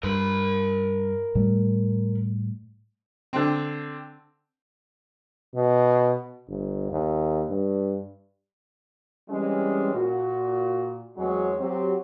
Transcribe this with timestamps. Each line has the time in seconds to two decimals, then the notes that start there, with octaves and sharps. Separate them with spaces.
0.03 G2 A#4 B5
1.35 A2 G3 A3
3.33 D3 C4
5.55 B2
6.47 G1
6.91 D#2
7.50 G2
9.29 E3 G3 G#3 C4 C#4
9.93 A#2 F#4
11.16 E2 F#3 G#3 C4 G#4 C#5
11.59 F#3 C4 G4